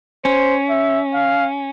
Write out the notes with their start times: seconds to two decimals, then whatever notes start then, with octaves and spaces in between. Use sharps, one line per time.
0.25 C#4 C5
0.69 E5
1.14 F5